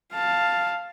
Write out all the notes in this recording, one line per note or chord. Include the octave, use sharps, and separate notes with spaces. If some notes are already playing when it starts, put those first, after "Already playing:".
F5 A5